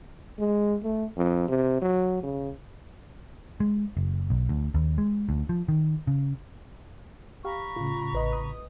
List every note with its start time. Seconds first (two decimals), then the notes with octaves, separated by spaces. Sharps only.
0.39 G#3
0.84 A3
1.17 F2
1.49 C3
1.82 F#3
2.23 C#3
3.60 G#3
3.97 F#1
4.30 B1
4.49 D2
4.74 D#2
4.98 G#3
5.29 D2
5.49 F3
5.68 D#3
6.07 C#3
7.45 G4 F5 A#5 B5 C#6
7.76 A2 C#3 F4
8.13 A1 B4 D#5
8.33 D#6